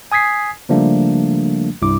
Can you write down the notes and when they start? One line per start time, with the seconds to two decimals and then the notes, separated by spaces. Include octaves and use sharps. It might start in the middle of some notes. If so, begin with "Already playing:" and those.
0.12 G#5 D#6 G#6 B6 C7
0.69 C#3 F3 G3 A3 A#3 D4
1.82 C2 G2 E4 D6